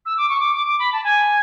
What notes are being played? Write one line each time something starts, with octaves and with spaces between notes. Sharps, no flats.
E6
D6
C#6
D6
D6
D6
B5
A5
G#5